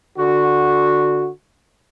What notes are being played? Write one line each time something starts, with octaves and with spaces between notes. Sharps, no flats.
D3 F#4